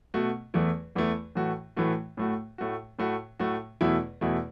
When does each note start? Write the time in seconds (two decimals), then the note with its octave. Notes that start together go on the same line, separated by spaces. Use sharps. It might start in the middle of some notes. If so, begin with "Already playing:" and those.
0.14 B2 A3 F#4
0.54 E2 E3 A3 E4
0.95 E2 E3 A3 E4
1.35 A2 E3 A3 F#4
1.76 A2 E3 A3 F#4
2.17 A2 A3 F#4
2.58 A2 A3 F#4
2.99 A2 A3 F#4
3.39 A2 A3 F#4
3.81 E2 B2 A3 E4
4.21 E2 B2 A3 E4